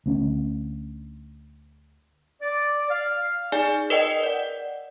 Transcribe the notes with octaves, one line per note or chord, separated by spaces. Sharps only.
D2 C#4
D5
F5
D#4 G#4 D5 G#5
A#4 B4 D#5 G5
D5 F#5